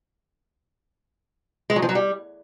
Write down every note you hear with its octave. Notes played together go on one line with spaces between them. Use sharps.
G#3
F#3
F3
F#3
G3